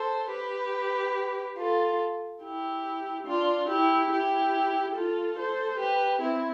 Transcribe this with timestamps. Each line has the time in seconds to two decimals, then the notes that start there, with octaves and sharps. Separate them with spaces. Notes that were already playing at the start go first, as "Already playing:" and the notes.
Already playing: A4 C5
0.31 G4 B4
1.58 F4 A4
2.43 E4 G4
3.27 D4 F4
3.69 E4 G4
4.11 E4 G4
4.95 F4 A4
5.38 A4 C5
5.80 G4 B4
6.22 C4 E4